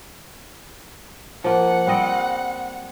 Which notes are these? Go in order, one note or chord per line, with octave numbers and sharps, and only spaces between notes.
F3 A#3 F#5
G3 C4 D#5